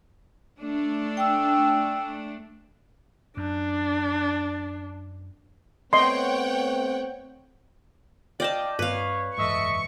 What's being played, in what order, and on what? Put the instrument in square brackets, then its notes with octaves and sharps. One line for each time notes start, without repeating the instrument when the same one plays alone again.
[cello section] A3 D4
[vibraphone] G5 E6
[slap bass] F#2 [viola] D4
[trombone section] A3 B3 C4 [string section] C#5 F#5 G5 [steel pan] D#5 C6
[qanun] D5 D#5 A5 [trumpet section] F5 G5
[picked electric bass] G2 C4 [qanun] B4 F5 [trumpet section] C#5
[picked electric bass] F#1 E2 G#2 [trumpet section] A4 D#5 E5 [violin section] C#6